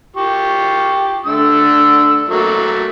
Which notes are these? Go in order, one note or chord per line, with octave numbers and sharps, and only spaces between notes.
F4 G4 C#6
D3 A3 E6
F#3 A3 A#3